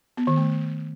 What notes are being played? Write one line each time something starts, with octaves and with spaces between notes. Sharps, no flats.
B3
D#3
A3